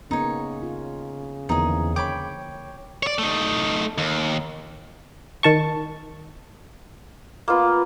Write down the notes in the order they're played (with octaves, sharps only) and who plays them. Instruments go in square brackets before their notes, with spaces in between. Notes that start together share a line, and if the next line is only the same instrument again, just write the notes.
[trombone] C#3 [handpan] A#3 B3 C#4 [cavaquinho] D#4 C#5
[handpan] F4
[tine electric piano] E2 E3 [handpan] D3 F3 A#3 [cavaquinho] D#4 G#4
[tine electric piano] C#5 G5 [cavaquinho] B5 D6
[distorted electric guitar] C#5 D5
A3 D#4
D#2
[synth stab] D#3 A5 C#6
[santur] A#3 B3 F4